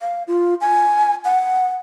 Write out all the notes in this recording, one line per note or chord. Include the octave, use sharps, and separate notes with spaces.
F5
F4
G#5
F#5